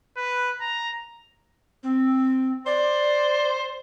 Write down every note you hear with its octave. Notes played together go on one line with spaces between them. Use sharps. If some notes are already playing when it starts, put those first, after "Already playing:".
B4
A#5
C4
C5 D5